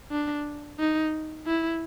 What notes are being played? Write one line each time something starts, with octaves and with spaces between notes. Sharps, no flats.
D4
D#4
E4